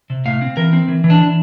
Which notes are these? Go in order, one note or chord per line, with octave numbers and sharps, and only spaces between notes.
C3
A2 F5
C4
E3 A#4
C4
E3
E3
D4
E3